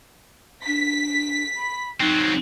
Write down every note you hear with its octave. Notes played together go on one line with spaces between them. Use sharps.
D4 B6
B5
F#3 C4 D#4